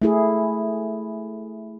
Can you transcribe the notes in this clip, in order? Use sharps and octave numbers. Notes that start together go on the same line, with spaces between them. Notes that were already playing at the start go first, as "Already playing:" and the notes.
A3 E4 G#4